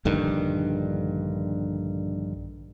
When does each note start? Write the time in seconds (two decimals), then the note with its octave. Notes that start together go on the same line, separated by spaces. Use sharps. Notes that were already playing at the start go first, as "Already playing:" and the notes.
0.05 A#1 G2 D3 D#3